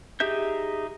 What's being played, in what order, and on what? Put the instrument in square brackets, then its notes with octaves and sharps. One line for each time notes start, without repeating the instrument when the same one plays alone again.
[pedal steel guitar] D#4 G4 G#4 E5 G6